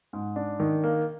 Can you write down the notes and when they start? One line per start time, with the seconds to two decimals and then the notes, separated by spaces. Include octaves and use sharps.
0.13 G#2
0.36 D4
0.60 D#3
0.83 A#3